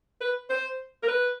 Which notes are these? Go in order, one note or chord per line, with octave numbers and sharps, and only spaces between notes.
B4
C5
A#4
B4